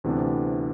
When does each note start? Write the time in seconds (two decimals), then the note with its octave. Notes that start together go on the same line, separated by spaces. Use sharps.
0.04 D2 C3 E3 B3 D4